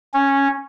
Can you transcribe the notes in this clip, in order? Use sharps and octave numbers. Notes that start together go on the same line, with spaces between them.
C#4